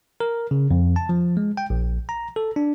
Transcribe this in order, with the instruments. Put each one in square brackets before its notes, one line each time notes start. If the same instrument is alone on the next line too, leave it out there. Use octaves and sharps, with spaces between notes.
[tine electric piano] A#4
C#3
F2
A5
F3
G#3
G5
A#1
A#5
A4
D4